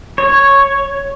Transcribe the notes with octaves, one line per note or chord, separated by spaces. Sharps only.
C#5